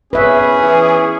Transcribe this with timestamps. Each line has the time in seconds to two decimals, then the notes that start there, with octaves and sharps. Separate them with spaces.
0.13 C#4 G#4 B4 E5
0.59 E3